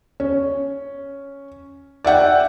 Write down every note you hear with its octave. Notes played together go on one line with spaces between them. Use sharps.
C#4
D5 E5 F#5 G5